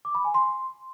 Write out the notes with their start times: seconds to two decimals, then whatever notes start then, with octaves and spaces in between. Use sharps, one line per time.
0.05 D6
0.15 B5
0.25 G#5
0.34 C6